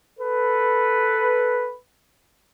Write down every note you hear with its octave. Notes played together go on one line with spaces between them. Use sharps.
A4 B4